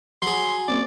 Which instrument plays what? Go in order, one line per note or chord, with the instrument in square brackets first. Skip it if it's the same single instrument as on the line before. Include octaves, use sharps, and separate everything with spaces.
[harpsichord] F#3 G#4 [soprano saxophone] C6
[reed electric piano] A#3 C4 C#4 [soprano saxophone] D5